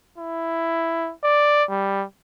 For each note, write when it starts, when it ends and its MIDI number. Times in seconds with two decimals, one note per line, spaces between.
0.18 1.12 64
1.24 1.64 74
1.70 2.04 55